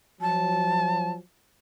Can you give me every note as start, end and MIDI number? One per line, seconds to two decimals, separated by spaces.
0.21 1.18 53
0.21 1.18 54
0.21 1.11 81